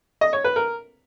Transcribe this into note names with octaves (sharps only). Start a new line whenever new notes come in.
D#5
C#5
B4
A#4